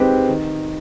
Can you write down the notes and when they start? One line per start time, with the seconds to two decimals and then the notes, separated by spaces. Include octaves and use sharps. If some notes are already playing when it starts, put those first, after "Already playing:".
Already playing: D#3 G#3 C4 G4 B4
0.28 D#3